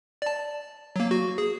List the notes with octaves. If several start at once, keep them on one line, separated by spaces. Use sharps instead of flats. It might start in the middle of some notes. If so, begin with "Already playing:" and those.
D5 A5
F#3 A#3
F#4
G#4